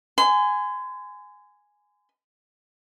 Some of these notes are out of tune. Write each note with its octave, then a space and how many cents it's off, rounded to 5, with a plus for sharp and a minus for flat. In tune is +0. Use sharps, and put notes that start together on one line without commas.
G#5 +0 C6 -40